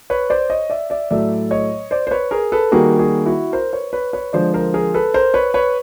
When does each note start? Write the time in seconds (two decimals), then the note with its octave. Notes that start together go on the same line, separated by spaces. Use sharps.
0.10 B4 C#5
0.30 C5 D5
0.50 C#5 D#5
0.70 D5 E5
0.90 D5 E5
1.11 A2 F#3 A3 D5 E5
1.51 C#5 D#5
1.91 C5 D5
2.07 C5
2.11 B4 C#5
2.31 G#4 A#4
2.52 A4 B4
2.72 D#3 G3 A#3 F#4 G#4
2.99 F#4 G#4
3.26 E4 F#4
3.53 A#4 C5
3.73 B4 C#5
3.93 B4 C#5
4.13 B4 C#5
4.33 D3 F3 G#3 C5 D5
4.54 A#4 C5
4.74 G#4 A#4
4.94 A4 B4
5.14 A#4 C5
5.34 B4 C#5
5.54 B4 C#5